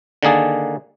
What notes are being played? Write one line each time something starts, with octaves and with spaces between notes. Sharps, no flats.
D3 D#3 A#3 G#4 A5